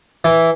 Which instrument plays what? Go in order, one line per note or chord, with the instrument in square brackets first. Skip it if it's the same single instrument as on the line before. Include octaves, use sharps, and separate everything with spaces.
[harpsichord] E3